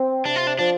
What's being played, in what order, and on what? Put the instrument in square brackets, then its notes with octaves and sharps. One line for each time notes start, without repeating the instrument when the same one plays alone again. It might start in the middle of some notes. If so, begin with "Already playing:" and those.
Already playing: [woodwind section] C4
[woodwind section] C3 [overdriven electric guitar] D4
[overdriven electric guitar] F4
D4
[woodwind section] F3 [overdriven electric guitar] D4